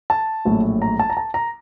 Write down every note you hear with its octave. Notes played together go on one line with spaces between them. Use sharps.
A5
A#1 A2 F#3
A#5
A5
A#5
A5
A#5